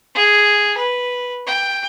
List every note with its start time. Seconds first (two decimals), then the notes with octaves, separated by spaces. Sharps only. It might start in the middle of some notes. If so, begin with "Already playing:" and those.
0.15 G#4
0.77 B4
1.47 G5